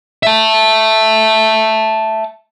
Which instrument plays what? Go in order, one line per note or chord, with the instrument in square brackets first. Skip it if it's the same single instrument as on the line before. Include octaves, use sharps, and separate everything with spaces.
[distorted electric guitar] E5 A5